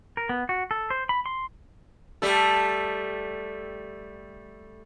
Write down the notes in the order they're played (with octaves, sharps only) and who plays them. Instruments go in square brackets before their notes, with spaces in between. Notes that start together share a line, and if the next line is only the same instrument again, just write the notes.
[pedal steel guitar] A#4
B3
F#4
A4
C5
B5
C6
[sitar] G3 A3 A4